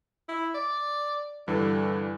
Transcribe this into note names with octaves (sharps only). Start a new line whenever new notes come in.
E4
D5
G2 D3 E3